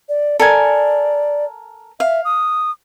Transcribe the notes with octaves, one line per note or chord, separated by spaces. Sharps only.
D5
A4 A#4 D5 G#5
E5 F5
D#6